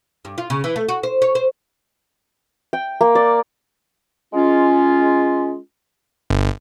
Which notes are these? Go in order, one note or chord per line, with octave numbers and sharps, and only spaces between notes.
G2
F4
C#3
E3
A3
F#4
C5
C#5
C5
G5
A#3
D5
G#3 C#4 F4
G1